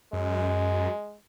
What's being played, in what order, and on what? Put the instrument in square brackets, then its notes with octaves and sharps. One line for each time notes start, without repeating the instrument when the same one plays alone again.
[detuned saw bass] F#2 [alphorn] G#3